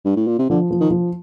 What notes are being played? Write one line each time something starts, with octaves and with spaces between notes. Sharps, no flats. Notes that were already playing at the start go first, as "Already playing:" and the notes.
G2
A2
A#2
C3
D3 F3
F3
D#3
F3